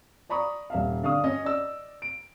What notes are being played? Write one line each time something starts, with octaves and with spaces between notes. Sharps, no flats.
D5 A#5 B5 C#6 D#6
D#1 E5 F5
D3 D4 F5 C#6 D#6
C#4 C#5 D#5
D5 D#5 E6
D7